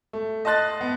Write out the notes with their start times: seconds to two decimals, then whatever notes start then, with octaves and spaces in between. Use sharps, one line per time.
0.13 A3
0.45 D#5 A5 C6 F#6 A6
0.81 B3